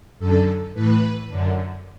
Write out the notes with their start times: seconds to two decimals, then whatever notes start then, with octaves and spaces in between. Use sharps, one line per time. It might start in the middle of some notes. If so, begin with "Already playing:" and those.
0.19 F#2 D3 A4
0.74 A2 E3 B4
1.28 F#2 D3